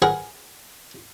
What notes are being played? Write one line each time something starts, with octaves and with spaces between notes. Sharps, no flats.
G#4 A#4 B4 F#5